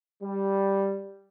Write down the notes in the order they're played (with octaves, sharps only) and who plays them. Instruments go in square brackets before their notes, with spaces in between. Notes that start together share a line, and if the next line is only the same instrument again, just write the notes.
[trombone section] G3